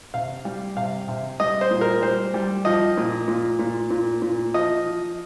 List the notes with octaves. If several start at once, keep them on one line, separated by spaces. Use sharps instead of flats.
C3 F5
G3
C3 F5
C3
G3 D#5
C5
A#2
A#4
G3 C5
G3
F3 D#5
A#2
A#2
A#2
A#2
A#2
F3 D#5
F3